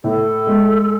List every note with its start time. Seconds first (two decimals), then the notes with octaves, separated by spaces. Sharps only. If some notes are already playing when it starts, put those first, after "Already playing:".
0.04 A2 A4
0.47 G#3